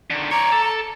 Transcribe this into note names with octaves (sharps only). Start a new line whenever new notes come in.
D3 D#3
C#5 D5 A#5
A4